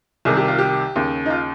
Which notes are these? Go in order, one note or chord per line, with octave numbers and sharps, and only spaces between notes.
C2 C3 D#3 G#4
G4
F4
G4
D#2 C#3
D#4
F4